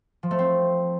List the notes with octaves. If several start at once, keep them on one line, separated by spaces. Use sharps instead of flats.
F3
A3
C4